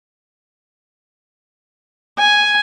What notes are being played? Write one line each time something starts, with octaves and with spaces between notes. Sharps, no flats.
G#5